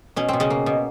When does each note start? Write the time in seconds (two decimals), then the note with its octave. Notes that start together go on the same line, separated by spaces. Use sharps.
0.16 B2 C#4
0.29 B2 C4
0.40 C#3 C#4
0.50 A#3
0.66 B2